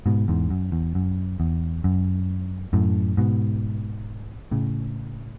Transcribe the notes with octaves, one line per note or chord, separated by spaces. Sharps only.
G#2 B2
E2 G#2
F#2
E2
F#2
E2
F#2
F#2 A2
G#2 B2
A2 C#3